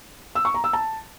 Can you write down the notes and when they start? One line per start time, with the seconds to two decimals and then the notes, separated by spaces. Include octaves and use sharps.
0.35 E6
0.45 C#6
0.54 A#5
0.64 E6
0.73 A5